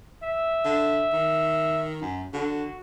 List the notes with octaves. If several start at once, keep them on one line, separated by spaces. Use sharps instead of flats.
E5
D3
D#3
F#2
D3 F#4